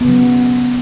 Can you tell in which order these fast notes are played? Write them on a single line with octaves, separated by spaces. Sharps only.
B3 C#3 F#3